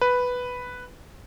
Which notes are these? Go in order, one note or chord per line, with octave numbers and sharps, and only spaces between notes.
B4